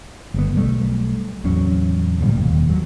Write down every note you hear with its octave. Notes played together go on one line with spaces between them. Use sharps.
G1 E3 B3
B1 G3 A3
D1 E2 F#3 C#4
C#2 A2 C3 G3
E1 D#2
D#2 F#3